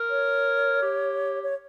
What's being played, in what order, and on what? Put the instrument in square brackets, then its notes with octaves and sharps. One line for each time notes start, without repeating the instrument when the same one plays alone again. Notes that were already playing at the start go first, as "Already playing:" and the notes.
Already playing: [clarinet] A#4
[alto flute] C#5
[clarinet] G4
[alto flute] C#5